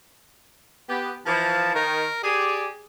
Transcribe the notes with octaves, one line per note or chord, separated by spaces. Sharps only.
B3 G4
E3 F3 A5
D#3 A#4
G4 G#4 D5